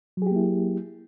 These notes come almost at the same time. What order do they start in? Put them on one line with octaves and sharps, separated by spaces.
F#3 G#4 G4 A#3 E4